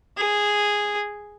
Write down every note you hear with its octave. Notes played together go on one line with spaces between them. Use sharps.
G#4